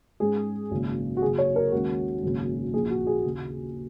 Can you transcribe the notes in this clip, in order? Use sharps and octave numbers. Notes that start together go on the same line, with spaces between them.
G#2 G#3 C#4 G#4
G#1 F#2 C#3 A#3
F#4
F#2 C#3 A#3 G#4
C#5
A#4
D#2 D#3 G#3 C#4 F#4
G#1 F#2 C#3 A#3 C#4
A#1 A#2 A#3 G#4
F#4
G#4
D#2 C#3 A#3